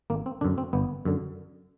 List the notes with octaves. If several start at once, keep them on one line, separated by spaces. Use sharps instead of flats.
G#1 A#3
C4
F#2 D3 D4
C4
G1 B3
F#2 D3